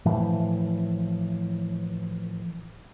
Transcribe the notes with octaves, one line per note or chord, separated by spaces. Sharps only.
A2 E3 F3